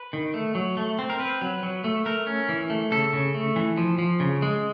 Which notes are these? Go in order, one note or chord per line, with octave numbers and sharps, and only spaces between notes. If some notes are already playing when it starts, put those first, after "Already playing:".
Already playing: B4
D#3
A3
F#3
A3
C4
A#4
C4 B4
F#3
F#3
A3
A3 A#4
C#4
E3
A3
C#3 A4
C#3
A3
E3
F3
F3
C#3
G#3